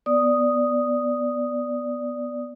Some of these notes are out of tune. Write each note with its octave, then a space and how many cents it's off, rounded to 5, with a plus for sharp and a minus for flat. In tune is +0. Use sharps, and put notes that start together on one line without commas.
B3 +0 D5 +0 D#6 +0